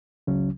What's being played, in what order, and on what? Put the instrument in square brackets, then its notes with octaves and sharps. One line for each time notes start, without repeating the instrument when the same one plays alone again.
[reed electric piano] C#2 C#3 F#3 C#4